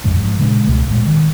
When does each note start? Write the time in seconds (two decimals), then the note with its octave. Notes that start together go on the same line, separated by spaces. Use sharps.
0.04 A1 F2 G#2 C#3
0.16 G#2 F3
0.39 A#2 C#3 G#3 D4
0.67 C#2 B2 A3
0.88 A1 A#2 G#3
1.07 D#3